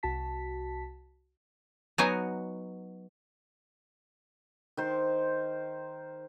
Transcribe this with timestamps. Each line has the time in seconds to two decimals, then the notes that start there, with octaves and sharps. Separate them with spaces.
0.03 C2 F#4 A5 B6
1.98 F#3 B3 D#4 F#4 G#5 A#5
4.77 D#3 C5